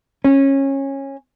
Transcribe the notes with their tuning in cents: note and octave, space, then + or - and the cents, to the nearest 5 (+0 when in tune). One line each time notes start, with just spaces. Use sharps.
C#4 -20